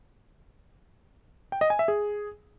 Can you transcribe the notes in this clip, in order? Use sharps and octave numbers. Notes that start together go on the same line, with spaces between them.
G5
D#5
G#5
E5
G#4